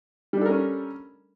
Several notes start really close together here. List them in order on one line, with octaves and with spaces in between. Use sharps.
G3 D4 A4 A#4 C#4